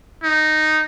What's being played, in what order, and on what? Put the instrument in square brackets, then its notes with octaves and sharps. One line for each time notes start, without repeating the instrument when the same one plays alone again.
[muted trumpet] D#4